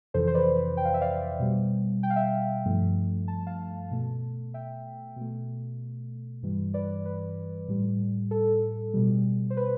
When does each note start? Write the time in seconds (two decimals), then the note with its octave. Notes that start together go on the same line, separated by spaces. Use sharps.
0.14 F2 C3 E3 A4 C5
0.27 C5
0.34 B4 D5
0.56 B4
0.77 G5
0.85 F5
0.94 E5
1.01 D5 F5
1.39 B2 G3
2.03 G5
2.10 F5
2.16 E5 G5
2.65 G2 F3 A3
3.28 A5
3.47 F5 A5
3.91 B2 A3
4.54 E5 G5
5.16 B2 A3
6.43 G2 E3 G3
6.74 B4 D5
7.06 B4
7.68 A2 G3
8.31 A4
8.94 B2 G3
9.50 C5
9.57 B4